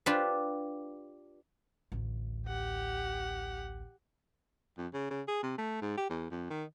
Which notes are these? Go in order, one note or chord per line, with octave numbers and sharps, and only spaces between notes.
D4 F4 G4 B4
A1 D2
G4 F#5
F2
C#3
C#3
G#4
C3
A3
G#2
G4
E2
F2
D#3